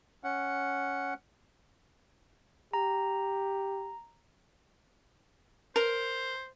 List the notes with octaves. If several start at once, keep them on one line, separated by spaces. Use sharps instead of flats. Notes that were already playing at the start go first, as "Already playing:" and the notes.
C#4 F#5
G4 A#5
A#4 C5